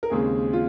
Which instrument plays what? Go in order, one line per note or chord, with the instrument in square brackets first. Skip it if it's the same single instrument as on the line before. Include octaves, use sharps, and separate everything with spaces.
[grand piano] A#4
D#2 C#3 G#3 C4 G#4
F4